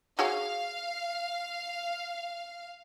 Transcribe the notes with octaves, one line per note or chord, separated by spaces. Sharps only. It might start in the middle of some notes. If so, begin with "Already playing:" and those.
F#4 G#4 C#5 F5